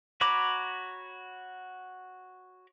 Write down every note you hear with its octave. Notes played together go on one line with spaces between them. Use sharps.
F#4 C#5 A#5 B5 D6